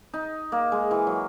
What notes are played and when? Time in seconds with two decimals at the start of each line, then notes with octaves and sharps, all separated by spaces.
0.14 D#4
0.52 A#3
0.72 G#3
0.91 E3
1.07 F#3